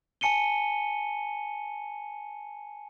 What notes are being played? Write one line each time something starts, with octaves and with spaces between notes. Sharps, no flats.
G#5 A5 C#7 D#7 G7